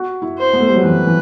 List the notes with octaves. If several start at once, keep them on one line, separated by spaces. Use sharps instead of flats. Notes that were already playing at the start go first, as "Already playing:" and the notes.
Already playing: F#4
E4
C5
B3
A3
G3
F#3
E3 B4
E3